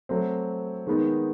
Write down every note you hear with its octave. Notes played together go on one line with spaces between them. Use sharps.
F#3 A3 C4
D#3 G#3 B3 D#4